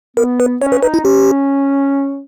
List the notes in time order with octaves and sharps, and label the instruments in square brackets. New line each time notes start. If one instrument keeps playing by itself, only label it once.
[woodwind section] B3 [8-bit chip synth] A#4
[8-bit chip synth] B4
[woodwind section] C#4 [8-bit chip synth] C#5
[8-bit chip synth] B4
[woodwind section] D#4 [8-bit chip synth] B4
[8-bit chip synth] E4
[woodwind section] C#4 [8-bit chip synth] G4